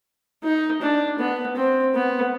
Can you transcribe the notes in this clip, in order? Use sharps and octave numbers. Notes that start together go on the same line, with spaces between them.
D#4
D4
B3
C4
B3